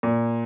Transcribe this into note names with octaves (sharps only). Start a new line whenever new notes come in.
A#2